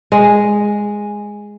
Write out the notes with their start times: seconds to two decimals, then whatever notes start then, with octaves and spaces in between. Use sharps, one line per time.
0.12 G#3